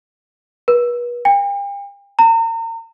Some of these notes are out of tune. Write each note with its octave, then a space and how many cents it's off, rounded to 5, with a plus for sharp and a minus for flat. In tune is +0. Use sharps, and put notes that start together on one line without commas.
B4 -40
G5 +40
A#5 -35